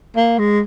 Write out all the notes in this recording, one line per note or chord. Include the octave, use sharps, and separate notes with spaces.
A#3
G#3